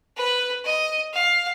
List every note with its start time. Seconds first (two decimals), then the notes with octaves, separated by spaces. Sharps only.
0.17 B4
0.65 D#5
1.13 F5